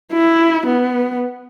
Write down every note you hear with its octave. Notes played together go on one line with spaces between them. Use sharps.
E4
B3